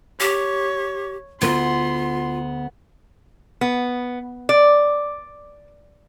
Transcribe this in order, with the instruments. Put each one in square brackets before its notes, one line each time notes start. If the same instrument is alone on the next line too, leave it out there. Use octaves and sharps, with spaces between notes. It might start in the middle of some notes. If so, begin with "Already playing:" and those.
[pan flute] G4 [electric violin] C#5
[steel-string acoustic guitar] D2 B3 [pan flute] F4 [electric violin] C6
[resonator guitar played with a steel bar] B3
D5